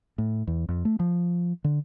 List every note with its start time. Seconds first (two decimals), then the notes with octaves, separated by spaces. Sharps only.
0.18 A2
0.47 E2
0.69 F2
0.85 A3
1.00 F3
1.64 D3